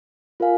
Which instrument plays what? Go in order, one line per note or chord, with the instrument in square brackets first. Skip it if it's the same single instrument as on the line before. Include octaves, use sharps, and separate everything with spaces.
[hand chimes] F4 A#4 F5 G#5